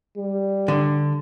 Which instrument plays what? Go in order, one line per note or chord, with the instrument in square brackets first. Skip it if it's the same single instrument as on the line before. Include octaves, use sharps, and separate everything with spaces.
[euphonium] G3
[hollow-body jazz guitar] D3